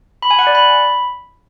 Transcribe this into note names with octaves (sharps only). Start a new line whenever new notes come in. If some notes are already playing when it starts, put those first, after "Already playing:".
B5
G#5
F#5
D5
B5